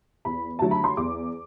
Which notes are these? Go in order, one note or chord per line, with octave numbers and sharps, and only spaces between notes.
E2 B5
D3 F#3 A3 A5
B5
C6
E2 D6